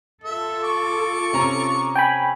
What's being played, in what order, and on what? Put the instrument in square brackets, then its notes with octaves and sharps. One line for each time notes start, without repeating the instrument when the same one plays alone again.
[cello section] F4 A4 [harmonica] E5
[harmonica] C#6 D6
[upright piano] C3 C#4 A#5
[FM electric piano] G5 G#5 B5